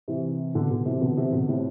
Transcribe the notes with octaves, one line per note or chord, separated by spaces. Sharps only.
C3 E3
B2 D3
B2 D3
C3 E3
B2 D3
C3 E3
B2 D3
A2 C3